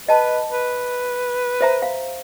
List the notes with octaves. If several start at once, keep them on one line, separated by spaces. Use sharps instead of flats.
B4 D#5 A5
B4
C5 E5 A#5
F5